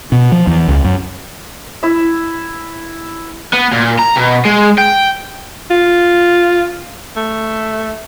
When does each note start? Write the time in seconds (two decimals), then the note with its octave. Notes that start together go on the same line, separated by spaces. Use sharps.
0.12 B2
0.32 F3
0.47 E2
0.68 C#2
0.84 F#2
1.83 E4 E5
3.53 B3
3.73 A#2
3.99 A#5
4.16 B2
4.45 G#3
4.78 G5
5.71 F4
7.16 A3